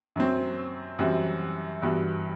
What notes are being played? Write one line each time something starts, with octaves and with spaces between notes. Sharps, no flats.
F#2 F#3 C4
F#2 E3 G3 C4 F#4
G2 E3 B3 F#4